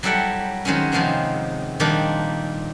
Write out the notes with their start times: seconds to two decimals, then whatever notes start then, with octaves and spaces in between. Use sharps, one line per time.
0.03 F#3 G3 E4 A4 F#5 G5
0.65 D#3 F#3 G#3 C4 C#4
0.92 C3 D#3 F3 G#3 B3 C4
1.80 A#2 D#3 F3 G3 D4 D#4